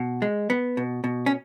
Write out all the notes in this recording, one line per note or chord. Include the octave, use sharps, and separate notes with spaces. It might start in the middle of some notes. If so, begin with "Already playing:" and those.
Already playing: B2
G#3
B3
B2
B2
C#4